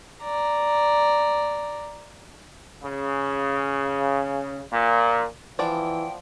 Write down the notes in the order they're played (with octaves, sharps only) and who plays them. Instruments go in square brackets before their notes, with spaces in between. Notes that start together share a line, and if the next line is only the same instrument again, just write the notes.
[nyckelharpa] D5 A#5
[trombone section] C#3
A#2
[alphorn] E3 [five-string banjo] F3 B3 D5 [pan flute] G5